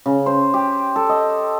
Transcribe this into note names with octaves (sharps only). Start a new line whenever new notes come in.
C#3
C5
G4
A4
D#5